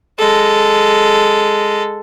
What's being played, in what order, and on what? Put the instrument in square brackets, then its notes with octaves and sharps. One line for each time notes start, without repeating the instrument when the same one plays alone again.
[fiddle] G#3 A4